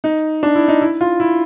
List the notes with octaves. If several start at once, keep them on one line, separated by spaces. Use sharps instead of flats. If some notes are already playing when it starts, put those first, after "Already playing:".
D#4
D4
E4
D#4
E4
F4
E4